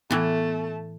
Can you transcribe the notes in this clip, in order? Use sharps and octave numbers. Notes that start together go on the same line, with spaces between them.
A2 E3 A3 B3 A5